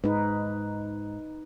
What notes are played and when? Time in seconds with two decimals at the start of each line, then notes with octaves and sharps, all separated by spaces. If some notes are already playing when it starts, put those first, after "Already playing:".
0.04 G#2 D#4 B4